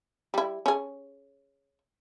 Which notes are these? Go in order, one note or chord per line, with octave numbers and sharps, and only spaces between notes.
G3 E4
C#4 G#4